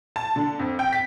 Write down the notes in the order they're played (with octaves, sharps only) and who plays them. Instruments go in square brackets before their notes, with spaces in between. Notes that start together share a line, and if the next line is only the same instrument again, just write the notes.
[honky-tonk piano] A5
D3
F2
G5
B6